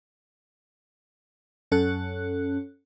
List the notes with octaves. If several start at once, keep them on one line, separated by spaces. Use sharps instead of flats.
F#2 C#4 A4 C#5 F#6